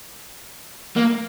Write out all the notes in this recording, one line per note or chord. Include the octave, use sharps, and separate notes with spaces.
A#3